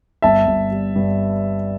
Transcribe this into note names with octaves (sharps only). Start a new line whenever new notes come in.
G1 E5 A5
G1
G3
G2